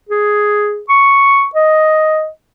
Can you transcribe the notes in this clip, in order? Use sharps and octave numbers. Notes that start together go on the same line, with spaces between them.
G#4
C#6
D#5